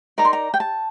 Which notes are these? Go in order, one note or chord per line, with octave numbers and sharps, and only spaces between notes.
D#4 A#4 D5 A#5
C6
A#5
G5
A5